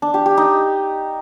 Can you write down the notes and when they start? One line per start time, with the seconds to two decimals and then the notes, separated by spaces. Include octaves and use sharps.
0.02 D4
0.14 G4
0.26 G4
0.37 D#4